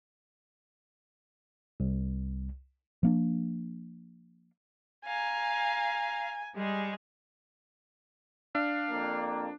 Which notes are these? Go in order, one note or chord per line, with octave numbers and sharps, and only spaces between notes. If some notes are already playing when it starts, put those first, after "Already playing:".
C2
F3 A#3 D4
F5 G#5 A#5
G3 G#3 G#4
D4 F5
F2 A#3